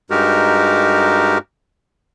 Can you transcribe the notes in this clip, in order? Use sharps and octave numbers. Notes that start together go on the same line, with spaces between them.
G2 G#3 D#4 F#4 G4 A#4